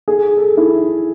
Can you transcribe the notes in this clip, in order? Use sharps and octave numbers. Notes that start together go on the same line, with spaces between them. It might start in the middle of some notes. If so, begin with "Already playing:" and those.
G#4
A4
E4